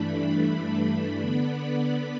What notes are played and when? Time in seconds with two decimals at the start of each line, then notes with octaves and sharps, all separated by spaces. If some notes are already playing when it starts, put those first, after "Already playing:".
Already playing: G2 E3 A3 D4 B5
1.19 D3 B3 D4